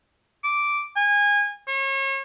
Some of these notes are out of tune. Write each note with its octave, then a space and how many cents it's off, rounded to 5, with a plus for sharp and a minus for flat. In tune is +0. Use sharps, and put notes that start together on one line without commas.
D6 -5
G#5 -25
C#5 -35